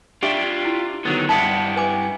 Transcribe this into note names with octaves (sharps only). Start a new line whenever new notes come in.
D4 F4 G4 E5 G5
E4
D3 D#3 F#3 B3
G2 E4 G4 E5 F#5 A5 D#6
B4 G#5 D6